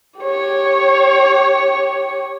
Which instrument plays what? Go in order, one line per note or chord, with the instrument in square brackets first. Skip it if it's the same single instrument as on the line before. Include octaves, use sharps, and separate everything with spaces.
[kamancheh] G4 C#5